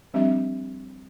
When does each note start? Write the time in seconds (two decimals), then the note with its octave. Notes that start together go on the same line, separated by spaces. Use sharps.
0.14 F3 G3 C4 D4 G4 E5